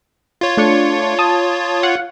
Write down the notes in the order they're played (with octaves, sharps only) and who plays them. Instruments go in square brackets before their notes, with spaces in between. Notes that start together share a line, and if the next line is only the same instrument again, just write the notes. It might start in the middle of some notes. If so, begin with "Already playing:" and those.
[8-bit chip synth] F4 C#5
[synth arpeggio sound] A3 D4 C#6
A5 D#6
F5 F#5